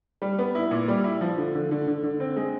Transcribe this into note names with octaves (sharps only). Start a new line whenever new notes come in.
G3
B3
E4
A#2
G3
E4
F3
D3
D3
D3
D3
D3
C4
G#3